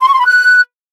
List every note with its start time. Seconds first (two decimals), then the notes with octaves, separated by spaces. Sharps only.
0.01 C6
0.07 C#6
0.13 C6
0.20 B5
0.26 F#6